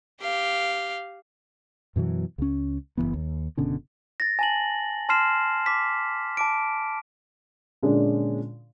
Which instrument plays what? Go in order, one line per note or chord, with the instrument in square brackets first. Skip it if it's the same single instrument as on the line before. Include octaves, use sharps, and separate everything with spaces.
[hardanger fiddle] G4 F5
[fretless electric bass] F#2 B2 E3 F#3
C#2 C#4
F#1 F2 E3 B3
D#2
F#1 B2 D3 C#4
[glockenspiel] A6 A#6
G#5 A5 F#7
A5 C6 F6 C7 E7
D6 B6
A5 D6 D7
[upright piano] A#2 D3 G#3 C#4 D4